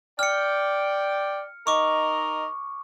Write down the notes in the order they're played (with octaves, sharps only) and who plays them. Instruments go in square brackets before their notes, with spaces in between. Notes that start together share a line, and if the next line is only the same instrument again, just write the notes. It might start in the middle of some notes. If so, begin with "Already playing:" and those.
[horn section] D5 G5 [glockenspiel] F6 C#7
[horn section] D#4 A#4 D#5 [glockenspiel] C#6 D6